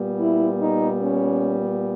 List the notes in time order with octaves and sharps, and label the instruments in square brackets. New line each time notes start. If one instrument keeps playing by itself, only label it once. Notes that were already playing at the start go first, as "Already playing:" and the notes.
Already playing: [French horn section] A#2 G3 B3
E4
D#4
C#4